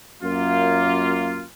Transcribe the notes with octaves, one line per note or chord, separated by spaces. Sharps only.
F#2 A#3 F4